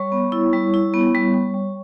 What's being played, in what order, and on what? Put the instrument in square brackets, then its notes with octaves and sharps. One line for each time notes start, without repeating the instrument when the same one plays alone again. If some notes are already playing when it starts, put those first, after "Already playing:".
Already playing: [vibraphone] G3 C#5 C#6
B3
E4
G3
E4
B3
G3
G3
G3